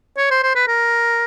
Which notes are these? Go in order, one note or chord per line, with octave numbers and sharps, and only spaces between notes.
C#5
C5
C5
B4
A#4